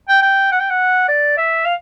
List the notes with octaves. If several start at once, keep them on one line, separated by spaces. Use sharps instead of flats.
G5
G5
F#5
G5
F#5
D5
E5
F5